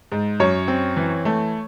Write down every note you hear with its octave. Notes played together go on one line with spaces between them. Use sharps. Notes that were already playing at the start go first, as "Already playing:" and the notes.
G#2
F#2 C#5
C4
E3
A3